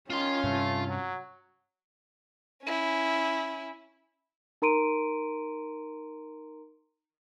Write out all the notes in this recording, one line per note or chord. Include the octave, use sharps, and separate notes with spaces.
D#3 C#4 F4 C6
G2 C3 A3
F#3
C#4 E4
D#4 A#4 A#5 C6 D7 D#7